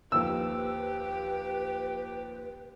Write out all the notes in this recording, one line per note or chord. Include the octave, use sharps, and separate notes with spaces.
D#2 F3 G4 B4 E6